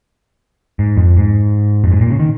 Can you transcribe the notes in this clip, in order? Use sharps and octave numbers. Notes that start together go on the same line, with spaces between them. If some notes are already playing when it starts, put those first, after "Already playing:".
G#2
F2
G#2
F2
G#2
A#2
C#3
D#3